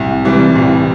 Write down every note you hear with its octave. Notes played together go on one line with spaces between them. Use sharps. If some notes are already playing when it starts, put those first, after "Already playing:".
Already playing: C2
C3 E3 G3
C2